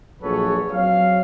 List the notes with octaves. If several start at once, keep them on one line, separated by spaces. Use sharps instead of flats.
A#1 F#3 G#4 A4 B4 C#5
F#3 C4 C#5 F5